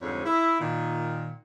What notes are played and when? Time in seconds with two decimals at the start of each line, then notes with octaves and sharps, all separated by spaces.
0.02 F2 G#2 D3 G3 G#4 C#5
0.24 E4
0.60 A#2 D#3